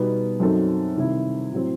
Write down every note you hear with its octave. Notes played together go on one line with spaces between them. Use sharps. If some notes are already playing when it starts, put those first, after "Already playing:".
Already playing: B2 G3 B3 D#4
F#2 F#3 C4 D#4 A4
C3 D#3 G3 C4 E4
A2 F#3 C4